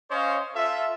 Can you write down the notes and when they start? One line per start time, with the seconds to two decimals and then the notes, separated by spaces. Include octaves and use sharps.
0.11 C#4 C5 C#5 D#5 F5
0.56 F4 A4 E5